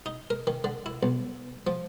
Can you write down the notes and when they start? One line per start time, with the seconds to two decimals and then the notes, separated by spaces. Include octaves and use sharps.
0.06 D#4
0.30 A#4
0.47 D#3
0.64 D3
0.86 E4
1.03 B1
1.67 F3